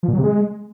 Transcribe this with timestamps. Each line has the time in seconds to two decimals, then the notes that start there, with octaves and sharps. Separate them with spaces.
0.03 F3
0.08 A#2
0.13 F#3
0.18 C3
0.24 G#3